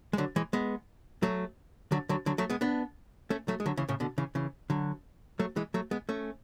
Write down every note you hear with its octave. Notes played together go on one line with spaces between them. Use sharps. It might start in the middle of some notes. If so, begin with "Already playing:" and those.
G#3
D3 F#3
E3 G#3
G#3 B3
F#3 A3
D3 F#3
D3 F#3
D3 F#3
F#3 A3
G#3 B3
B3 D4
A3 C#4
F#3 A3
G#3
D3 F#3
C#3 E3
A2 C#3
B2 D3
C#3 E3
C#3 E3
D3 F#3
F#3 A3
E3 G#3
F#3 A3
G#3 B3
A3 C#4